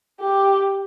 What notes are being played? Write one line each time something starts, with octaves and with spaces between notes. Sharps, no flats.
G4